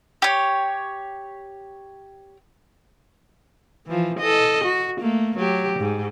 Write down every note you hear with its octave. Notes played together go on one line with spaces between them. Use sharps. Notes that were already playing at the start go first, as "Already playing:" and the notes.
G4 C#5
E3 F3
A4 D#5
F#4
A3 A#3
F#3 G4
G#2